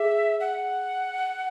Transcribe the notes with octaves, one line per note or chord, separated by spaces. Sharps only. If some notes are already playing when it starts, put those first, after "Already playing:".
Already playing: G#4 E5
F#5